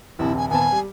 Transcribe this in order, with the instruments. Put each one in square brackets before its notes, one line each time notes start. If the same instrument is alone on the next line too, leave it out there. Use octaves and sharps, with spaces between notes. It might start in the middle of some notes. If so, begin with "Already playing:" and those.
[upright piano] D#1 A#1 C3 [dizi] E4
[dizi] G#5
[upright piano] D#1 B3 A5 [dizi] G#5
[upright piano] G3